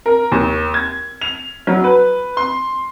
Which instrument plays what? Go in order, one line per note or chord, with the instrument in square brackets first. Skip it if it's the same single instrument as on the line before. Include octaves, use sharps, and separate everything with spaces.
[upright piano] A#4
D#2
G#6
F7
F#3
B4
C6